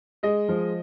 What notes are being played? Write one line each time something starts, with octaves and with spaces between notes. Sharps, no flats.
G#3 D#5
F3